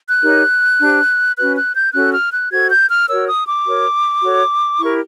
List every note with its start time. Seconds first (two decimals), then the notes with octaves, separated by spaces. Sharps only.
0.08 F#6
0.22 D#4 G4 A#4 C#5
0.80 D4 G4 C5
1.37 C#4 F#4 B4 F#6
1.56 F#6
1.75 G6
1.94 C#4 F#4 A4 F#6
2.13 F6
2.31 F#6
2.50 F#4 A4 C5 G#6
2.70 G6
2.89 F6
3.08 F#4 A#4 C#5 E6
3.27 D#6
3.46 D6
3.65 F#4 A#4 C#5
4.22 F#4 A4 C#5
4.79 E4 G4 A#4 C#6